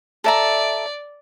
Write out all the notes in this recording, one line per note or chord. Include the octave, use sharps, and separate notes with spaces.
A4 D5 E5 A#5